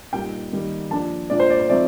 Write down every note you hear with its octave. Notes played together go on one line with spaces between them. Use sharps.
A#2 G3 A#3 D#4 G5
D#3 G3 A#3 D#4
F3 A#3 D4 A5
A#2 A3 D4 D5
C5
D5
C5
F3 A3 C4 D#4 D5